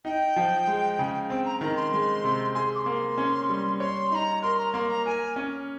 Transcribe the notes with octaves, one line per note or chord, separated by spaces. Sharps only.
D#4 G5
F3
G#3
C#3
C4 G5
A#5
D#3 A#5
C6
G#3
C3
G#4 C6
D6
C6
A#3
C#4
G3
C#5 C6
D#4 A#5 C6
A#4 C6
A#5
A#3 C6
A#5
A#4 G#5
C#4